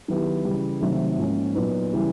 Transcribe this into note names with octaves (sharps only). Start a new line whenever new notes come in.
D#3 F#3 B3 E4 G4
C#3 E3 G3
C3 D#3 F#3 A3
G#2 F3 A#3 C#4
A#2 F#3 B3 D#4
C#3 E3 G3